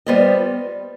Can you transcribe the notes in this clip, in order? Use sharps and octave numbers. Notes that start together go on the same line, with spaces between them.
G3 B3 F4 C5 D#5